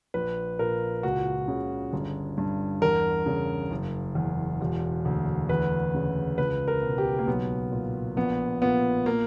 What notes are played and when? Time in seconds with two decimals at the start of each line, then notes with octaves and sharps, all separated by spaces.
0.14 A#1 B4
0.59 A#2 A#4
1.03 C#2 F#4
1.48 C#3
1.93 G1
2.38 G2
2.82 E2 A#4
3.26 C#3
3.71 F#1
4.15 E2
4.61 E1
5.05 D2
5.49 E2 B4
5.94 C#3
6.38 C#2 B4
6.68 A#4
6.83 B2
6.98 G4
7.19 A#3
7.27 B1 B3
7.72 A#2
8.17 A#1 B3
8.62 A#2 B3
9.06 A#3